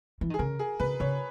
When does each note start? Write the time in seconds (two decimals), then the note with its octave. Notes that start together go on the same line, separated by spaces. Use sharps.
0.21 E3
0.30 D#3
0.34 G#4
0.39 C#3 A#4
0.59 G#4
0.80 C#3 B4
1.00 C#3 C#5